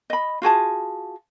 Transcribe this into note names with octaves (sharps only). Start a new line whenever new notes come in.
D#5 B5
F4 F#4 G#4 A5